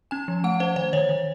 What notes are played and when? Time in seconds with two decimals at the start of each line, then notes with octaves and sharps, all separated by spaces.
0.11 C#4 G#5
0.28 F3
0.44 A3 F#5
0.60 C#4 C5
0.76 D#3 C5
0.93 D#3 C#5
1.09 D#3